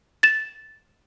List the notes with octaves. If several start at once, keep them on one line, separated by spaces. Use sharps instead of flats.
A6 E7